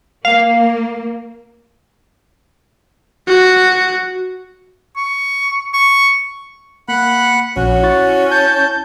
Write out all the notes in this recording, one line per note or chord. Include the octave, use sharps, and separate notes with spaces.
A#3 F5
F#4
C#6
C#6
A#3 F#5 B5 F#6
A#1 C#4 F#4
E4 C#6 A6
A5 G6